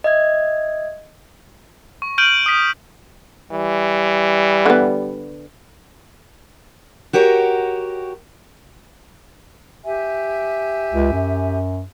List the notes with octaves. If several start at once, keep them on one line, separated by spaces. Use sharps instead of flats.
D#5 E5 G#6
C#6
F6 G6 D7 D#7 F#7
D#6 B6
E3 G3
D3 B3
F#4 G4 A#4 C#5
G4 E5 G#5
C#2
F#2